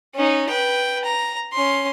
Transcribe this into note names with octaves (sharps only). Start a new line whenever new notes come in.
C#4 D#4
B4 G5
A#5
C#4 C6